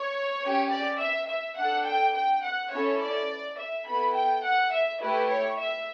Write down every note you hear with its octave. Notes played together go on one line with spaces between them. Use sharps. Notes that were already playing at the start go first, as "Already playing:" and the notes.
Already playing: C#5
C#4 G4
D5
E5
E5
D4 A4 F#5
G5
G5
F#5
C#4 E4 A4 C#5
D5
E5
B3 E4 A4 B5
G5
F#5
E5
A3 E4 G4 B4
C#5
E5